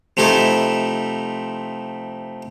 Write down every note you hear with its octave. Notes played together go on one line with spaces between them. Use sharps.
C3 F3 A3 D#4 E4 A4